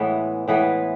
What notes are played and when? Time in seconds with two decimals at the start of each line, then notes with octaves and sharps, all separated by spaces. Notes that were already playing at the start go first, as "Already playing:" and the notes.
Already playing: A2 E3 G#3 B3
0.48 A2 E3 G#3 B3 B4